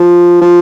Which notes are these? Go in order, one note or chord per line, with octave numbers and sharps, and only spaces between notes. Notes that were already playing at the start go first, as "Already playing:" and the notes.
Already playing: F3
F3